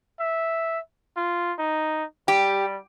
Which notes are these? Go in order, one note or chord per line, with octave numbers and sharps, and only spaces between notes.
E5
F4
D#4
G3 G4